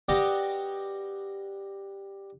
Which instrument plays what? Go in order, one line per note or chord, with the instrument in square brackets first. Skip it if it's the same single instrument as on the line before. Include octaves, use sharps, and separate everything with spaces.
[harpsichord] G3 F#4 G4 B4 D5 D#5